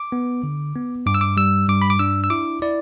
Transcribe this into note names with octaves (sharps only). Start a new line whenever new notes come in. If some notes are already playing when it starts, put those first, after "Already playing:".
Already playing: D6
B3
D3
B3
G2 D6
E6
D6
G3 E6
G2 D6
B5
D6
D4 E6
E6
E4 D6
E4 D5